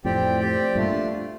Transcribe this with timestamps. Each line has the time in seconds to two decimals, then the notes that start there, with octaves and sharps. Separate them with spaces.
0.05 F2 A2 C4 G4 D5 G5
0.40 C4 G4 D5 G5
0.75 G2 A#2 A3 D4 F4